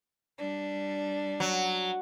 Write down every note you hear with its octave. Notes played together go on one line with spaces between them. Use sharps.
G3 D4
F#3